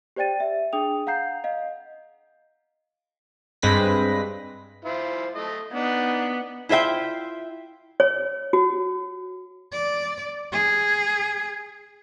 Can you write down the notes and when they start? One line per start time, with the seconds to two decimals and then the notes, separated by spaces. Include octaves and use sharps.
0.16 G4 C5 D5 G5 A6 D#7
0.40 E5
0.73 D4 G#4 G5 D#6 F7
1.07 F5 F#5 A#5 G6 C7
1.44 D#5 F5
3.62 G2 G#3 C4 B4 A#6 B6
4.85 E4 F4 C5
5.35 A3 D#5
5.74 B3 D4 D#4
6.69 E4 F4 C5 E5 G5
8.00 C#5
8.53 F#4
9.72 D5
10.52 G#4